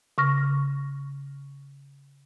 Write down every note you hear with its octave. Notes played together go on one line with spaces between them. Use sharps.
C#3 C#6 F6 A#6